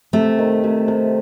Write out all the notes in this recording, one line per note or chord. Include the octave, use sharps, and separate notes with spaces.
C3 A3
D#3
C3
C3